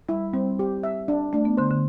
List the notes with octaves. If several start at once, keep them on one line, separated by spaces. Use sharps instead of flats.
G3 E4
G3 C4
G4
E5
D4
A3 D4
B3
D3 C5
D3